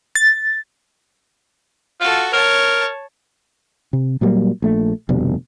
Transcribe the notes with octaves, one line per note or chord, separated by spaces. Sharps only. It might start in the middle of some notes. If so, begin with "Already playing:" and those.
A6
F4 F#4 A4
A#4 C#5 A5
C3
A#2 F#3 G3 A#3
A#1 A3
F1 D2 B2 G3